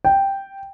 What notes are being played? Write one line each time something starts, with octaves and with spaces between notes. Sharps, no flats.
G5